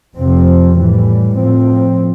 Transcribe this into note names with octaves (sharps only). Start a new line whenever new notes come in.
F2 C3 F3 C4
A2 E3 G3
A2 F3 C4